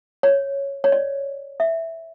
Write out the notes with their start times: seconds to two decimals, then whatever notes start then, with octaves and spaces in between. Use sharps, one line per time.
0.23 C#5
0.84 C#5
0.92 D5
1.60 E5